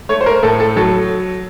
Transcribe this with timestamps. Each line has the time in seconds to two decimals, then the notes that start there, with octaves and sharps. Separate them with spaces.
0.09 A3 C#5
0.21 C5
0.26 A#4
0.43 A2 A4
0.60 A4
0.76 F#3 A4